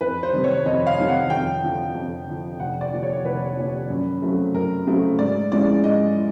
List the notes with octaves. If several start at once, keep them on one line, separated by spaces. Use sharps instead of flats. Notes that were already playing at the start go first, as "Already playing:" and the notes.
F2 B4
C5
C3 D#3 G3
C#5
F2 D#5
F5
C3 D#3 G3
F#5
F2 G5
D3 F3
F2
D3 F3
F1 F#5
D5
D#2 D3 F3
C#5
F1 B4
D#2 D3 F3
F#2
C#3 F#3 A3 C4
F#2 A#4
C#3 F#3 A3 C4
G#2 D5
F3 G#3 C#4 E4 D5
G#2 D#5
E4